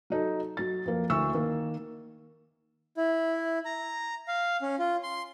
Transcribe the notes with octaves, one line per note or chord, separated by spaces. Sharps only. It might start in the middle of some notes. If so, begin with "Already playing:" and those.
F#3 D#4 A4
F#3 A6
F2 A#3
D2 E4 C#6 E6
D#3 A#3
E4
A#5
F5
C#4
F4
C6